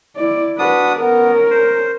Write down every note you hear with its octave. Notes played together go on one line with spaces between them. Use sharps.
E4 D5
D4 F#4 B4 D#6
B3 C#4 A#4
C5